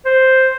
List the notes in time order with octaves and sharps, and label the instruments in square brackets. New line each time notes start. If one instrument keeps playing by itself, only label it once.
[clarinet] C5